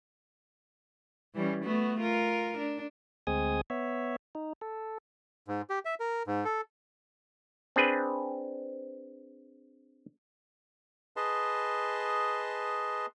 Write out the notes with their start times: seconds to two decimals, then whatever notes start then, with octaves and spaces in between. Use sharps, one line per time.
1.34 E3 G3 C#4
1.64 A3 B3 F#4
2.00 F4 A#4
2.57 D4
3.27 D2 G#3 C4 G#4 G#5 D#6
3.70 B3 C#5 E5
4.35 D#4
4.61 A4
5.48 G#2
5.70 G4
5.85 E5
6.00 A#4
6.27 G#2
6.45 A4
7.76 C4 D4 G#4 B4
11.16 G#4 B4 D#5 A5 C6